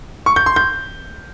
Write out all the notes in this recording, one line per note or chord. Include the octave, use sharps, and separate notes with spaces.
C#6
G6
C6
G6